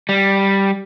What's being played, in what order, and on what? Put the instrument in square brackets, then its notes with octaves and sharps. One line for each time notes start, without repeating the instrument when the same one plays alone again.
[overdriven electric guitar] G3